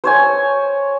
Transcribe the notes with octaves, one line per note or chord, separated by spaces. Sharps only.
C5 C#5 G#5